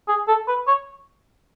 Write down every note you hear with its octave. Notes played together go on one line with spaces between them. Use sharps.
G#4
A4
B4
C#5